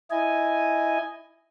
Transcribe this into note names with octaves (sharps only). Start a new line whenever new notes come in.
E4 D#5 G#5